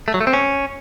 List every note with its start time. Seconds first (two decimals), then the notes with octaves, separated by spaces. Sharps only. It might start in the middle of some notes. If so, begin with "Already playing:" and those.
0.08 A3
0.14 F#3
0.21 A3
0.27 C4
0.33 C#4